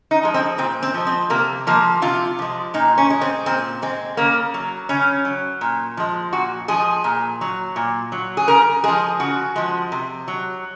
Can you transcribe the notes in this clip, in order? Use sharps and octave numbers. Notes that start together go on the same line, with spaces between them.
D#4
F3 G#3
C4
A#2 C4
C4
F3 G#3
C4
C3 A#3
F3 G#3 A#3
C3 F4
F3 G#3
A#2 D#4
C#4
G#3
C4
A#2 C4
G#3 C4
C#3 A#3
F#3
C#3 C#4
F#3
A#2
F3 G#3
A#2 F#4
F3 G#3 G#4
A#2
F#3
A#2
F#3
G#4
C#3 A#4
F3 G#3 G#4
C#3 F#4
F3 G#3
C3
F#3